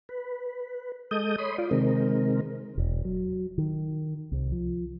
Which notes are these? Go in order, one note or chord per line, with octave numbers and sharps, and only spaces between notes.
B4
G#3 A4 D#5 D#6 G6
C#5 B5 C6 D#6
F4 D5
C3 D#3 G#3 C4 A#4
E1
F#3
D#3
C2
F3